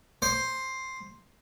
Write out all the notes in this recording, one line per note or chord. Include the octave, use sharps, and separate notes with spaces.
C5